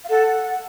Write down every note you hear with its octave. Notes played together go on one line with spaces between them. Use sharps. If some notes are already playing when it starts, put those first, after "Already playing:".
F5
A4 F#5